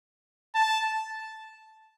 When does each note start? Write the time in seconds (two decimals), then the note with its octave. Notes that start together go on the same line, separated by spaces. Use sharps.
0.55 A5